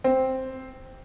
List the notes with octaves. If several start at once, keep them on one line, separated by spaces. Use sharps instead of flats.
C4